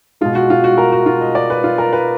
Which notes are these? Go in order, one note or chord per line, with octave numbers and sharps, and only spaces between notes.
B2 G#3 F4
F#4
F4
F#4
A#4
F#4
F4
D#5
D5
B4
F4
A#4
B4